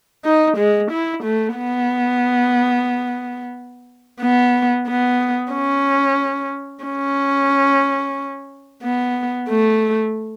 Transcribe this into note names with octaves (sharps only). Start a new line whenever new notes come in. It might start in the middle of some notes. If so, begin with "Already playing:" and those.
D#4
G#3
E4
A3
B3
B3
B3
C#4
C#4
B3
A3